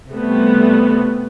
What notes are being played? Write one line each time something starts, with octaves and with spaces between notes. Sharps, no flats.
C3 G3 A3 B3